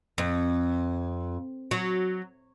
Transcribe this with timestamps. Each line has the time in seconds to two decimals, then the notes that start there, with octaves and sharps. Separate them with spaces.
0.18 F2
1.71 F#3